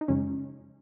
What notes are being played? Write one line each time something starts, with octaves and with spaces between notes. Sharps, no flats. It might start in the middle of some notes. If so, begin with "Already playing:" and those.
D#4
F#2 C#3 F3 G#3 C#4